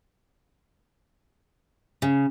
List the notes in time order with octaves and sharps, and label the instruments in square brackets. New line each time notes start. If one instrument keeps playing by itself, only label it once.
[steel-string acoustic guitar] C#3